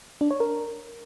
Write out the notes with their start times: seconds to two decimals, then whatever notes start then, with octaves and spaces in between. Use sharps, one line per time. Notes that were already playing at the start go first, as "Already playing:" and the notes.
0.21 D4
0.31 C#5
0.40 A#4